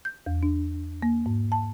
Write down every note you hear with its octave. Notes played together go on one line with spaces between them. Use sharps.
G6
E2
D4
A#3
G#2
A5